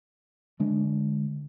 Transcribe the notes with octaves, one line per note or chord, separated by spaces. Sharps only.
D3 G#3 D4